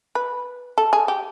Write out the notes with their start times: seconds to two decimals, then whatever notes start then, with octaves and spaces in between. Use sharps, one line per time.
0.15 B4
0.78 A4
0.93 G#4
1.08 G4